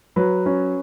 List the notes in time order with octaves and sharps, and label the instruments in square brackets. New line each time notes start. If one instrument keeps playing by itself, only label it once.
[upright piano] F#3 B4
C#4